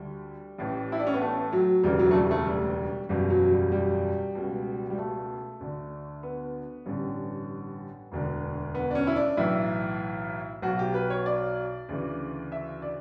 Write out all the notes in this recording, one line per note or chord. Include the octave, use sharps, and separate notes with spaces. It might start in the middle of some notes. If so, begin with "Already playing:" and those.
Already playing: D2 D3 G3
A1 A2 E3
E4
D4
C#4
B3
A3
F#3
E1 D2 C#3 E3 G3
F#3
A3
G3
A3
G3
F#1 E2 B2 G3
F#3
G3
G3
C#2 B2
G3
A3
D2 D3
B3
A1 G2 D3
E1 D2 D3
B3
D4
C#4
E4
D4
B1 A2 E3 E4
B1 B2 F#4
G4
B4
C#5
D5
D2 C#3 E3
E5
D5